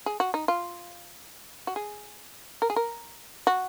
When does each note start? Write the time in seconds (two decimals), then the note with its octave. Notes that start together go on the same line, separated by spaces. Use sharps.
0.06 G#4
0.20 F#4
0.34 D#4
0.48 F4
1.67 F#4
1.76 G#4
2.62 A#4
2.70 G#4
2.76 A#4
3.47 F#4